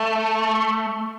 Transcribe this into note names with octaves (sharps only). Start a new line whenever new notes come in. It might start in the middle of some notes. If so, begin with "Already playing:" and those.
Already playing: A3